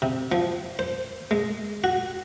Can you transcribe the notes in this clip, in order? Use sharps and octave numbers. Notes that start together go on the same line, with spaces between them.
C3
F3
C5
G#3
F#4